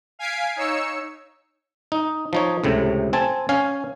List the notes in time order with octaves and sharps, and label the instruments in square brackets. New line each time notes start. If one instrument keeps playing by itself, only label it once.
[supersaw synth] F5 G#5 G#6 B6 C7 D7
D#4 C#5 E6 C#7
[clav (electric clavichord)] D#4
F3 D#4 C#5
C#2 A2 C3
C4 G#5 A5
C#4 F5 G#5